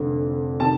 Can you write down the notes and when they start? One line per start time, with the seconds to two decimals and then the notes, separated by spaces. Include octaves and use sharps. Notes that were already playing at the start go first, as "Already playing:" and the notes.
Already playing: F1 F2 D3
0.60 C3 D#3 A5